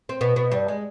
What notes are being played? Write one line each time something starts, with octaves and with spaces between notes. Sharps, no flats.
C4
B2 B3
B2 B3
G2 G3
G#3